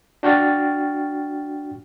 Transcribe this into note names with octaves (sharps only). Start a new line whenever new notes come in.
D4 F#4 G5 C#6 F6 A6